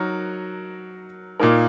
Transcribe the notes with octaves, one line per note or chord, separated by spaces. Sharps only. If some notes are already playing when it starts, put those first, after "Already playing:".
Already playing: F#3 D#4 F#4 A#4
A#2 A#3 D#4 A#4